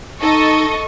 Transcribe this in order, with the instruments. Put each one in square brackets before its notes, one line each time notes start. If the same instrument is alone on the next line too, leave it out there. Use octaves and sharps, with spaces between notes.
[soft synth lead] D#4 [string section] A4 D#5 [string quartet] C#6